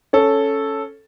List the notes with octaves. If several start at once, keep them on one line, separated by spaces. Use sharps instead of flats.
C#4 A4